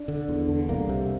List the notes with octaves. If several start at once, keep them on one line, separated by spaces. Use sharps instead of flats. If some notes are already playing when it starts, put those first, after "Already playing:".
Already playing: D4
D3
E2
D3
C2 A#3
C3